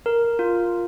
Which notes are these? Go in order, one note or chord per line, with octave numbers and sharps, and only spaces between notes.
A#4
F4